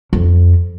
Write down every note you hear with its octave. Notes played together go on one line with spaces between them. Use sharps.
F2